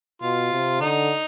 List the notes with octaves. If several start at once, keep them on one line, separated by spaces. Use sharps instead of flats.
B2 F4
C3
D3 D#4